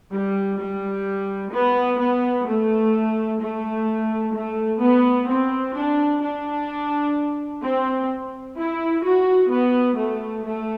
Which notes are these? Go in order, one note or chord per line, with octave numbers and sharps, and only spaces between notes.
G3
G3
B3
B3
A3
A3
A3
B3
C4
D4
D4
C4
E4
F#4
B3
A3
A3